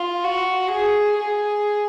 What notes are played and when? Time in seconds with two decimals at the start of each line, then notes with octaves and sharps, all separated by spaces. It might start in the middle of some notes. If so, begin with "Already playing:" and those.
Already playing: F4
0.24 F#4
0.71 G#4
1.18 G#4